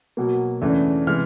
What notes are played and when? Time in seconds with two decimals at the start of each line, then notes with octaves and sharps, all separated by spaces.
0.17 B2 F#3 A#3
0.61 E2 C#3 E3 A3 D4
1.07 C3 E3 G#3 F6